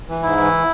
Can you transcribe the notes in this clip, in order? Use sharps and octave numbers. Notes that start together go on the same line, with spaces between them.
E3
G#2 E4
E3